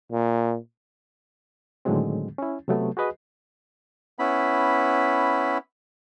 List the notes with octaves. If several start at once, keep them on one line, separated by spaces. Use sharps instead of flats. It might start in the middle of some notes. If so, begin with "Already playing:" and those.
A#2
A2 D3 D#3 F#3 G#3 C4
C#4 E4
C3 F#3 A3 B3
F#4 G#4 B4 D#5
B3 C#4 E4 B5